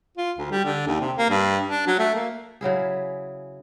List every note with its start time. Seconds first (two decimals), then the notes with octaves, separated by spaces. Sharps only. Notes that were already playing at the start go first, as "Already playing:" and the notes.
0.17 F4
0.38 D2
0.51 G3
0.65 D3
0.87 D#2
1.01 C3
1.16 A#3
1.30 G2
1.69 D4
1.87 F#3
1.99 A3
2.15 A#3
2.61 C#3 F#3 E4 G#4